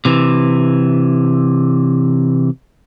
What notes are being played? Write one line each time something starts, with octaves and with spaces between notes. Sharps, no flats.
C3 E3